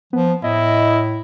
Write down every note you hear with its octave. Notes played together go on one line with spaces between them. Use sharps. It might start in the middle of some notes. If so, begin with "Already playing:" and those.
F3 B3
A2 E4 D#5